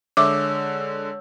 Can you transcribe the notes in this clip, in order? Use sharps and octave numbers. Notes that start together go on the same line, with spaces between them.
D3 G#3 C#5 E5 D6 E6